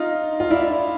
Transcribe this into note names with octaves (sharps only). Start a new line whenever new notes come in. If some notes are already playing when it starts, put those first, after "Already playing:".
Already playing: D#4 F4
F4
D4 E4